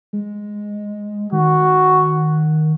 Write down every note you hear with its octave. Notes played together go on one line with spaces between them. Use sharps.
G#3
D#3 F#4